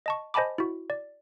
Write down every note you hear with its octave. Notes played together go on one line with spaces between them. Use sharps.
D#5 A5 C#6
C5 D#5 G#5 A5 B5 D6
E4 F#4
D5